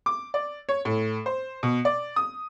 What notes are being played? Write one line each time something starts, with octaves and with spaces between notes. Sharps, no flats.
D6
D5
C#5
A2
C5
B2
D5
D#6